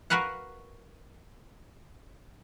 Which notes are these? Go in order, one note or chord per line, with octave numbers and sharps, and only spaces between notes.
F#4 A#4 B4 F5 F#5